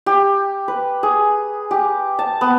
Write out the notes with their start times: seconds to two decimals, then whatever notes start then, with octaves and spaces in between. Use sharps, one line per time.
0.06 G4
0.68 B4
1.03 G#4
1.71 G4
2.19 A5
2.41 B3